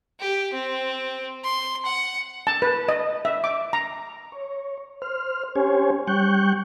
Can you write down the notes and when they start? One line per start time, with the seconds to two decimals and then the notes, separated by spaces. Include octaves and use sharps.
0.20 G4
0.53 C4
1.44 C6
1.85 F#5
2.47 A5
2.62 B4
2.89 D#5
3.25 E5
3.44 D6
3.73 A#5
4.32 C#5
5.02 C5 F6
5.56 C#4 G4 C5 C#5 G#5
6.07 G3 G5 C#6 F#6 G6